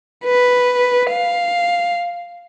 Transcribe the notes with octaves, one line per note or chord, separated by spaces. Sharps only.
B4
F5